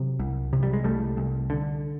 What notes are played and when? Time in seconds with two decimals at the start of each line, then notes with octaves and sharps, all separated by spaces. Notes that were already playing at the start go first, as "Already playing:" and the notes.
Already playing: C3 F#3
0.19 C2
0.53 C3
0.63 G3
0.73 G#3
0.84 C2 G3 A3
1.17 C2
1.50 D3